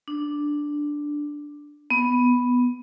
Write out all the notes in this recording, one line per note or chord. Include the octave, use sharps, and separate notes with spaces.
D4
B3